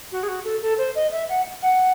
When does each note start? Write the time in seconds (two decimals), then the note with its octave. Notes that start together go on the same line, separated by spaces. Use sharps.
0.12 F#4
0.23 G#4
0.28 F#4
0.44 A4
0.61 A4
0.78 C5
0.95 D#5
1.11 E5
1.29 F#5
1.62 F#5